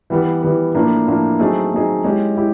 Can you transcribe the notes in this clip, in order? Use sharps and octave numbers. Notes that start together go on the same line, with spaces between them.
E3 G3 B3
E3 G3 B3
A2 F3 A#3 D4
A2 F3 A#3 D4
F#3 A3 C4 D#4 G#4
F#3 A3 C4 D#4 G#4
G#3 C#4 E4 G4
E4 G4